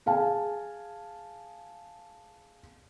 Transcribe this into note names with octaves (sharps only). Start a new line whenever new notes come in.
G#4 F5 G#5 A5